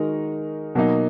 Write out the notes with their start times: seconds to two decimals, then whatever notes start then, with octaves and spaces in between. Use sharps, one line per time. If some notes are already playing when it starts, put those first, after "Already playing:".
Already playing: D#3 G#3 D#4 F#4 A#4
0.75 B2 F#3 A#3 D#4